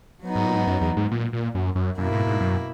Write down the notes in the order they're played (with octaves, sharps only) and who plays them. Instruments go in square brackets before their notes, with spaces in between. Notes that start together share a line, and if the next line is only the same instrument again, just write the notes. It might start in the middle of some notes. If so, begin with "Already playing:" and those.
[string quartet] F#3 B3 D#4
[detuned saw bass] G#2
A#2
G#2
F#2
E2
G#2
A#2
A#2
F#2
F#2
[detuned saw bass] F#2 [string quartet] B2 A#3 E4
[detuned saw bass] G#2
G#2
F#2